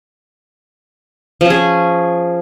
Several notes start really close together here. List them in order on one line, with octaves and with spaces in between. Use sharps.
F3 C#4 G#4